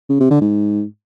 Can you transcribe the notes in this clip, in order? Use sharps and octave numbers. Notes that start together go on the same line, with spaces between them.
C#3
C3
D3
G#2